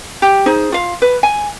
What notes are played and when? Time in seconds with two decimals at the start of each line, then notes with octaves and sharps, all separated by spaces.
0.22 G4
0.46 D#4 G#4 C5
0.72 F4 F5
1.02 B4
1.23 G#5